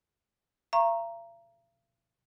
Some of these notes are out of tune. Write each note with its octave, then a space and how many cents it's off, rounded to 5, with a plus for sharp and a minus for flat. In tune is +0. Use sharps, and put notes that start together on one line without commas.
F5 -45 A#5 +0 C#6 -20